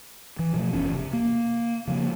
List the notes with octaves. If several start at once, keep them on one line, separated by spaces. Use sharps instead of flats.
E3
B2 F3 A3
F#1 E2 C#4
C3
A#3
C#3 F3 A3 A#3